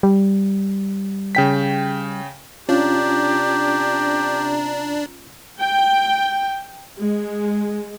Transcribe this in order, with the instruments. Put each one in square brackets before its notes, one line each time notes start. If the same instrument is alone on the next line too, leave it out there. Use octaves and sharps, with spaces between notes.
[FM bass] G3
[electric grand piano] C#3 G5 B6
[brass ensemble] C3 A#5 [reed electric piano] C#4 F4 [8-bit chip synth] D4 [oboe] G4
[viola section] G5
G#3